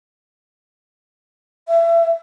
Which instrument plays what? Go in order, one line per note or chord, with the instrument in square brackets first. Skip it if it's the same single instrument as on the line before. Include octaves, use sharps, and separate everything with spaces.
[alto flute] E5